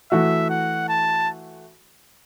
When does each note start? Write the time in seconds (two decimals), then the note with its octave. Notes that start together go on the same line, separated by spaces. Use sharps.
0.11 E3 A3 F#4 E5
0.50 F#5
0.88 A5